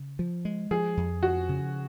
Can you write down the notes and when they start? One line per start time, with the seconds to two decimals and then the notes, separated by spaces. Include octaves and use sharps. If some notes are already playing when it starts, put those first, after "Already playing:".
Already playing: C#3
0.19 F3
0.45 G#3
0.71 F3 G#4
0.97 F2
1.23 F3 F#4
1.49 C#3